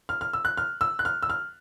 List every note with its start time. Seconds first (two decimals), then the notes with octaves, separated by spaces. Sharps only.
0.09 F6
0.21 F6
0.33 E6
0.45 F#6
0.57 F6
0.81 E6
0.99 F#6
1.05 F6
1.22 E6
1.30 F6